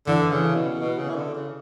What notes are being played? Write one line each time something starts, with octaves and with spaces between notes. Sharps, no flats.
D3 E3
C#3
B2
B2
C#3
E3
D3
C#3